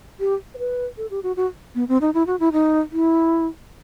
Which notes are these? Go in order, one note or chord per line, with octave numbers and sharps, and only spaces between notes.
G4
C5
B4
A4
G4
F#4
F#4
B3
C4
D#4
E4
F#4
E4
D#4
E4